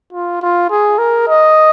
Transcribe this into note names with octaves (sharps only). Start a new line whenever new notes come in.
F4
F4
G#4
A#4
D#5